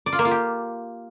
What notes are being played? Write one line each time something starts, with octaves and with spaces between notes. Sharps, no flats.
D5
F4
A#3
F4
G4